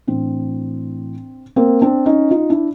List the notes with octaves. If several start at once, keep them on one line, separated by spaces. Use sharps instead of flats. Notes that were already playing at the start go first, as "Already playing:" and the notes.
A2 E3 C4 D4
A#3 C4
C4 D4
C#4 D#4
D#4 F4
D4 E4